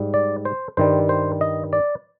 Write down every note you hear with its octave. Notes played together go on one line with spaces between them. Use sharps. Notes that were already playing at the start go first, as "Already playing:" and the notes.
Already playing: G#2 G3
D5
C5
G2 D#3 G3 C5
C5
D#5
D5